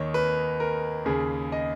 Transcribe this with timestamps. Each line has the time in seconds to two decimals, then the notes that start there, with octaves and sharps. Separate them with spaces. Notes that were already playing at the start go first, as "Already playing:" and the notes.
Already playing: D#2 D#3 C#5 D#5
0.14 B4
0.60 A#4
1.05 D#2 C#3 G#4
1.52 D#5